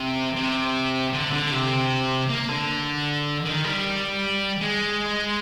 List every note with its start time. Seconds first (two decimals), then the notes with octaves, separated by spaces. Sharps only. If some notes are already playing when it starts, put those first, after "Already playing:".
Already playing: C3
0.36 C3
1.13 D3
1.33 D3
1.51 C3
2.29 A#3
2.49 D3
3.45 D#3
3.64 G3
4.61 G#3